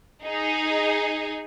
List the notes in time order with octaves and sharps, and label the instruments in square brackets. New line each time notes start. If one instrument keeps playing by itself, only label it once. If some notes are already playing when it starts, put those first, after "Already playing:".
[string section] D#4 G#4